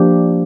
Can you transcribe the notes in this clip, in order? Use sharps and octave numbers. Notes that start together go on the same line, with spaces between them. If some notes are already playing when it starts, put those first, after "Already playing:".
Already playing: F3 A#3 D4 G4